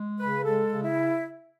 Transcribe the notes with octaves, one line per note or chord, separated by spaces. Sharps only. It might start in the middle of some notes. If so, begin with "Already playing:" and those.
Already playing: G#3
C#3 B4
G#3 A4
C#3
E4